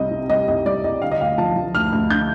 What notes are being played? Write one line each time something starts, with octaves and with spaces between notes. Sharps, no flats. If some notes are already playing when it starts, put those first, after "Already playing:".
Already playing: C2 C3 G3 D#5
C3
G3 D#5
C2 D#5
G3 D5
C2 D#5
D3 F5
D#5
D2 F5
F3 A5
F3
D2 F6
D2
D3 G6